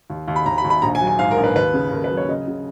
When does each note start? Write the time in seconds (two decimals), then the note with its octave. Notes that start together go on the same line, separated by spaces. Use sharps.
0.10 D#2
0.28 D#2
0.36 B5
0.46 D#2 A#5
0.58 B5
0.64 D#2
0.70 B5
0.82 A#1 A#5
0.95 G#5
1.01 F#3
1.07 G#5
1.19 G#2 F5
1.31 A#4
1.37 A#1
1.44 B4
1.55 D#2 B4
1.74 C#3
1.92 D#2 A#4
2.04 B4
2.11 F#3
2.17 C#5
2.29 C#3 D#5
2.48 C#3